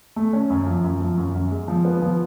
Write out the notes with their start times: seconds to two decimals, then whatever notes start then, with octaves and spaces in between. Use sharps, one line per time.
0.16 A3
0.33 C#4
0.50 F#2
0.66 F3
0.84 F#2
1.00 F3
1.18 F#2
1.34 F#2
1.51 G#3
1.68 F3
1.85 B3
2.02 F3